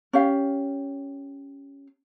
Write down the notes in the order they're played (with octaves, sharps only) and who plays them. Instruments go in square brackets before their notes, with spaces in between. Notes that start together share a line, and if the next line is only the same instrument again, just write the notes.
[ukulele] C#4 G4 F5